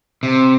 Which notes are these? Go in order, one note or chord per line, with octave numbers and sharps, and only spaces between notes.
C3